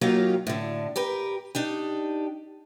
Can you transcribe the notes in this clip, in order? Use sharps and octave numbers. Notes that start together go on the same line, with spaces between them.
F#3 A#3 C#4 D#4 F4 G4
A2 D3
G4 A#4 B4
D4 D#4 G4